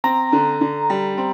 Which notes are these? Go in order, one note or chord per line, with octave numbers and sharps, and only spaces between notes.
C4 A#5
D3
D3
G3
C4